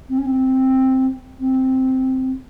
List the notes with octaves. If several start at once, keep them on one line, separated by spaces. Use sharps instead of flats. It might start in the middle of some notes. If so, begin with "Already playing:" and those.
C4
C#4
C4
C4